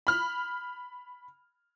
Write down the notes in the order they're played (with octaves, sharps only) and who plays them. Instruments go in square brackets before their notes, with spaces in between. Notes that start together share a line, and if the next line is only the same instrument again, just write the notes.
[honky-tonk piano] B5 F6